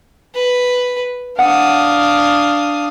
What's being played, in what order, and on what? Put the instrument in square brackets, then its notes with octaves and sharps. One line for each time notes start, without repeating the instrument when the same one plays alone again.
[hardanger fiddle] B4
[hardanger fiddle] D4 [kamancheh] F5 D#6 [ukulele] F#5